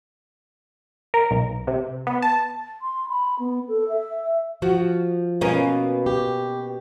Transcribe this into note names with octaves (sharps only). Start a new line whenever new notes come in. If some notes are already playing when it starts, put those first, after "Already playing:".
A#4
B1
C3
B3
A5
C6
B5
B3
A4
E5
F3 F#4
B2 A#3 C#4
G4